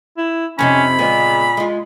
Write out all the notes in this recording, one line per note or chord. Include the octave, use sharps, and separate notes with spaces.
E4
F2 C3 C#4 D#4 B5
A#2 C#3 G#3 B3
G#3 F4